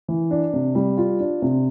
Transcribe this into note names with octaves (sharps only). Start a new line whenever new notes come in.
E3
D4
C3
G3
F4
D4
C3